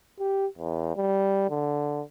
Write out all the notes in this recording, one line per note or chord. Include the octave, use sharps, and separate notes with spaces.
G4
E2
G3
D3